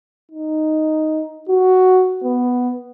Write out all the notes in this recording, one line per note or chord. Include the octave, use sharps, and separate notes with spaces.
D#4
F#4
B3